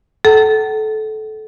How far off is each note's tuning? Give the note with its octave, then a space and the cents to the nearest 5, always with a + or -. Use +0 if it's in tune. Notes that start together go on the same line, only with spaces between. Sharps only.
A4 -20 F#5 +40 A#5 -45